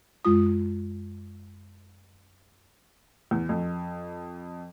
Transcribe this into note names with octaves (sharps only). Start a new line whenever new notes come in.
F#2 G#3 F4 D#6
E2
F2